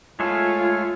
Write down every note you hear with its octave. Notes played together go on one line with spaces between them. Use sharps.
G#3 A3 F4 A4 C#5 E5 G#5 F6